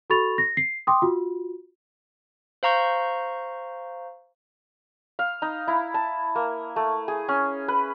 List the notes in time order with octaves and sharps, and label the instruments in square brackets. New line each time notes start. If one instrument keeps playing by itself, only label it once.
[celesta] F#4 A4 B5 C#6 A6 F7
A#6
C7
G5 C6 D6 D#6
F4 F#4
[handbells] C5 F5 A#5 C#6 G6
[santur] F5
D#4
E4
A5
A#3
A3
G#4
C#4
B4